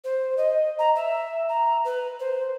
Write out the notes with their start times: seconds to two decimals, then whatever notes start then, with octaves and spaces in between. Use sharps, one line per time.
0.04 C5
0.37 D#5
0.79 A#5
0.96 E5
1.49 A#5
1.85 B4
2.20 C5